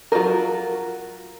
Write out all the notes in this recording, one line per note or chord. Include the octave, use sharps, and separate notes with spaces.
F#3 F4 F#4 G#4 A#4